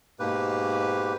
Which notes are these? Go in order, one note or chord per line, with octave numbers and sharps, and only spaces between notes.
G#2 B2 A#3 G4 B4